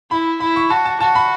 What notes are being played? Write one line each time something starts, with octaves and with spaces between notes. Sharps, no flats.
E4 B5
E4 B5
C#6
F#4 A5
A5
F#4 A5
B5